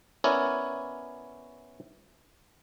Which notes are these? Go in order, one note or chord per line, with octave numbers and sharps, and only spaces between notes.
B3 C#4 E4 A#4 C#5 D5